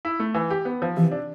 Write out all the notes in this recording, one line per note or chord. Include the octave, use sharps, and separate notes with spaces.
E4
A3
E3
G4
B3
F3
C3 E3
D4